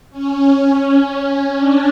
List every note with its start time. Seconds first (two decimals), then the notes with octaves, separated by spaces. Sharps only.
0.11 C#4
1.07 C#4
1.54 D4